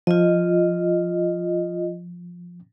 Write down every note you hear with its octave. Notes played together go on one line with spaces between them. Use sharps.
F3 F4 D#5